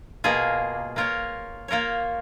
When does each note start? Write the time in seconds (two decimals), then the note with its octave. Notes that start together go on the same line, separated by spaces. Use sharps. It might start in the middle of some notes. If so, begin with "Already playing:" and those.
0.24 B2 A#3 F4 G#4
0.96 A#3 F4 A#4 C#5
1.68 A#3 F4 A#4 C#5